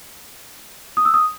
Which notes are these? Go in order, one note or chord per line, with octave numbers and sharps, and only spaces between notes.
D#6
E6
D#6